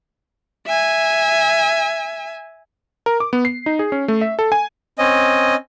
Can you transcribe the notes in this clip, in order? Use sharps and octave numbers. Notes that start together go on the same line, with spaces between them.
E5 G#5
A#4
D6
B3
C7
D#4
G#4
C#4
A3
E5
A4
G#5
C4 C#4 D#5